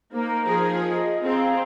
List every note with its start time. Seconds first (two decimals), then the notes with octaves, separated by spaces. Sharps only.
0.12 A#3 D#4 A#4 C5
0.46 F3 G#4
0.85 D#5
1.23 C4 G#4 F5 A#5